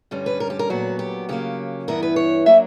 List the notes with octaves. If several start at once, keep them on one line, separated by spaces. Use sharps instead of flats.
G2 D3 G3 C#4
B4
A#4
G4
A#4
A#2 F#3 B3 F#4
G4
C#3 F#3 A#3 G4
G2 E3 B3 E4 A#4
B4
C#5
F#3 A#3 D4 E5